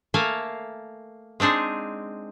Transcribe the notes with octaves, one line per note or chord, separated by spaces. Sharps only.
A3 A#3 A4 F5 G#5
G#3 C4 D4 D#4 G#4